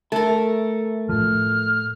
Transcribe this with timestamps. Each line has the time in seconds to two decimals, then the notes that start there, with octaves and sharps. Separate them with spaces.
0.12 A3 A4 A#4
1.09 A2 F3 F6